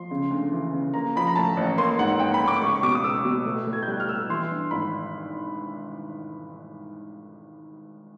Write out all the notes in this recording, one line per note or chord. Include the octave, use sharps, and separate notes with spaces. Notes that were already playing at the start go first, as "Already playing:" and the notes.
Already playing: F3 C6
C#3
D2
E3
C#3
A#3 A#5
F3 B5
A#5
A2 A5
A1
A#3 C6
G#2 F#5
F#5
A#3 G5
B5
A#3
D6
C#2 C#6
C#6
B2 D6
D#6
C#2 E6
B2
A2
A2
G#6
G6
G3 F#6
F6
A2 E6
E3 C6
G2
G#1 B5